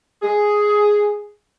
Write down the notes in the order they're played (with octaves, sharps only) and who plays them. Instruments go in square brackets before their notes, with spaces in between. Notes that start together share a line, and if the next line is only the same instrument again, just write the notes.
[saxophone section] G#4